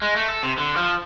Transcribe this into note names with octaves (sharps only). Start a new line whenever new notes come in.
G#3
A3
A4
C3
D3
F3